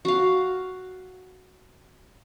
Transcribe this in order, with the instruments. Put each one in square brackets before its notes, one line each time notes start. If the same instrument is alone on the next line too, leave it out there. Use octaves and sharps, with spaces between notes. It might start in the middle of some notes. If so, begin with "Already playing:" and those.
[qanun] F#4 F5